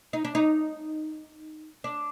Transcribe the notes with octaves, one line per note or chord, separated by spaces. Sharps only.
D#4
D4
D#4
D4